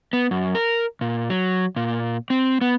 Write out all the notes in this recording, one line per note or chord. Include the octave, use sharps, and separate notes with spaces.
B3
F#2
A#4
A#2
F#3
A#2
C4
B3